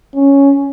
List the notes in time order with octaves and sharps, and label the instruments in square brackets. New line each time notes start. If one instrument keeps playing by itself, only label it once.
[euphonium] C#4